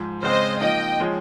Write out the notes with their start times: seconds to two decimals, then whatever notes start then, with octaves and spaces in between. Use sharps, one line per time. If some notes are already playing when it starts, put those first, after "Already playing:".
Already playing: G#2 F3
0.23 C#3 G#3 C4 C5 D#5
0.61 F3 A#3 D#4 D#5 G5
1.00 F3 G#3 C#4 G#4